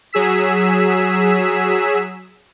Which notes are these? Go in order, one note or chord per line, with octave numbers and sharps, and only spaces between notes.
F#3 G#4 E6 B6